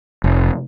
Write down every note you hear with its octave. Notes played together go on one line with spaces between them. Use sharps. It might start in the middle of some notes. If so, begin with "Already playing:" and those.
F1